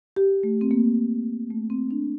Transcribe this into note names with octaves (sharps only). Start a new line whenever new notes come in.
G4
A3
C4
A#3
A3
C4
D4